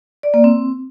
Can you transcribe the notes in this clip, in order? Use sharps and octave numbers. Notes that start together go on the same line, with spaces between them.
D5
A#3
C4